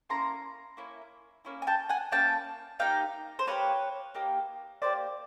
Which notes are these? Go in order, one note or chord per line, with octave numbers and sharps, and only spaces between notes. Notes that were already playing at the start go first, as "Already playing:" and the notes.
A#3 C#4 E4 A#5 C6
A#3 C#4 E4
A#3 C#4 E4
G#5
G5 A5
F#5 G#5
A#3 C#4 E4 G5 A5
A#3 D#4 G4 F5 G5
C5
A#3 D#4 G4 B4 C#5
A#3 D#4 G4
A#3 D#4 G4 C5 D5